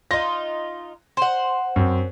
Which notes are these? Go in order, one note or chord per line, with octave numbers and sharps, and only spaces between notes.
D#4 F4 A#6
C5 F#5
F#2 C4